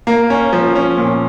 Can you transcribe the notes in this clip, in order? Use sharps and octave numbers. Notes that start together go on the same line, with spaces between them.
A#3
C#4
F3
C#4
A#2